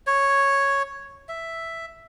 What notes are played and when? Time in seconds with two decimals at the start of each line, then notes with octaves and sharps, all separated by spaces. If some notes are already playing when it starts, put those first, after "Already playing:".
0.07 C#5
1.29 E5